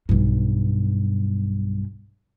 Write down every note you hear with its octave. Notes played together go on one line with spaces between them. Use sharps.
B1 G2